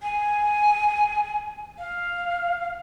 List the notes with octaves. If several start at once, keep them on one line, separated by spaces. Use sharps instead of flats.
G#5
F5